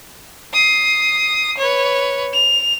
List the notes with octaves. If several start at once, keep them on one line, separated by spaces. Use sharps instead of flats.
D#6 C7
B4 C#5
F7